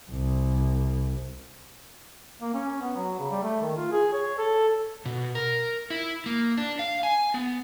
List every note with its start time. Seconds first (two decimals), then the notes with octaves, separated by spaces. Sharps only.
0.11 C2
2.41 A#3
2.54 C#4
2.81 B3
2.96 F#3
3.19 C#3
3.31 G3
3.43 A3
3.61 D#3
3.77 F4
3.92 G#4
4.13 C#5
4.38 A4
5.06 B2
5.35 A#4
5.90 E4
6.26 A#3
6.58 D4
6.79 F5
7.03 G#5
7.34 B3